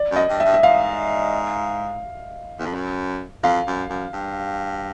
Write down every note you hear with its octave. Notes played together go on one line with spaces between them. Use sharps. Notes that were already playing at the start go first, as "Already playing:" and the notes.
Already playing: D5
F#2 D#5
G2
E5
G2
E5
G#2 F5
E2
F2
F#2
F2 F5
F#2
F#2
G2